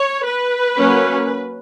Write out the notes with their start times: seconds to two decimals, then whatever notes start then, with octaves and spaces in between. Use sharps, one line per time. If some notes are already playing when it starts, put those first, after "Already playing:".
Already playing: C#5
0.25 B4
0.77 F#3 A#3 C#4